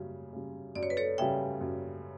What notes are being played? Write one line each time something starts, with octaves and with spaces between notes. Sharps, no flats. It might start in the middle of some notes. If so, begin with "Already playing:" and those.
Already playing: F#2 C#3 G3
C#3 G3
F#2 D5
C#5
B4
A4 C#5
C#3 G3 E5 G5
F#2